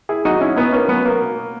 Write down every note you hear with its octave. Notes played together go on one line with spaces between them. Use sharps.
E4 G#4
F#3 D#4 F#4
C#4 E4
B2 B3 D#4
A#3 C#4
F#3 B3
A#3
B2